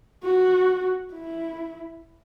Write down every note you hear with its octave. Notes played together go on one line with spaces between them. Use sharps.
F#4
E4